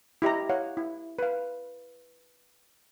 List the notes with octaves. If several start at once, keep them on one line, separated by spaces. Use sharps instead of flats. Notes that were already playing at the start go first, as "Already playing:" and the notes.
E4 G4 D#5 A#5
C#5 F5 F#5
E4
B4 F5